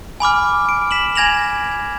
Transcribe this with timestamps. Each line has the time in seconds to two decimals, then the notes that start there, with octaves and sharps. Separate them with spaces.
0.20 G#5 B5 D6 F6
0.69 D7
0.91 B6 E7 F#7
1.15 G#5 G#6 A#6 F7 F#7